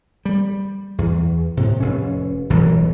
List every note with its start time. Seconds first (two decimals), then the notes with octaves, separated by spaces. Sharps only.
0.25 G3
0.98 E2
1.57 D2 A2 C3
1.80 F1 C#4
2.50 E1 B1 A2 E3